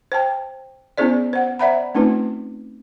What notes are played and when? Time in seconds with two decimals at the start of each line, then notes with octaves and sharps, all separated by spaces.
0.12 C5 G5 A5
0.98 B3 C#4 E4 G#4 C5 D5
1.33 C5 F#5
1.59 C5 D5 E5 F#5 A#5 B5
1.95 A3 C4 C#4 D#4 F4 B4